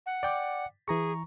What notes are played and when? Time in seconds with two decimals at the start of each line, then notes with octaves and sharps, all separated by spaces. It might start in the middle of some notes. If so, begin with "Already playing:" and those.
0.06 F#5
0.23 D5 G5 D6
0.88 E3 G#4 A#5 C#6